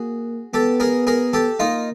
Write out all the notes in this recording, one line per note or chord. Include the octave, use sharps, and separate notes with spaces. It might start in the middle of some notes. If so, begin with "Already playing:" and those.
Already playing: A#3 F#4 G#4
B3 G4 A4
G#4 A#4
G#4 A#4
G4 A4
A#3 D#4 F4